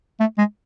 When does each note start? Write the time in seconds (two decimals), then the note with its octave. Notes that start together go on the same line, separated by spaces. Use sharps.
0.20 A3
0.38 G#3